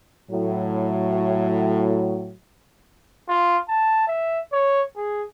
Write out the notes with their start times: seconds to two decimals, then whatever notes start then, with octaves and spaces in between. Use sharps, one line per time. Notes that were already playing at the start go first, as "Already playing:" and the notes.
0.30 A2 F#3
3.29 F4
3.69 A5
4.07 E5
4.52 C#5
4.96 G#4